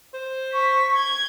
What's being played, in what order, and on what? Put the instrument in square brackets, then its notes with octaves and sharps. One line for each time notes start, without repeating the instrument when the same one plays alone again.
[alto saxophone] C5
[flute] C#6 [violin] B6
[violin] G6 G#6